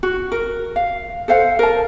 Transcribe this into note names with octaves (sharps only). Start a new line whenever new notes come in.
F#4
A#4
F5
A4 C5 F5 F#5
A#4 A5